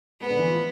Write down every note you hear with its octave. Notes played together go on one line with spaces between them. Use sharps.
G#3 B3 G#4
D3 D4
E3 E4
F3 F4